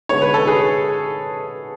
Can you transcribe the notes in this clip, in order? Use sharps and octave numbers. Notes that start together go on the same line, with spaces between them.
D3 G#3 B3 C#5
B4
A4
G#4 B4